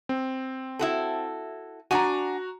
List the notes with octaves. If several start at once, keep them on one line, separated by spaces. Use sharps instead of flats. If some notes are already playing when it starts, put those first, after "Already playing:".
C4
E4 F#4 A4
D4 F#4 F#5 G#5 A#5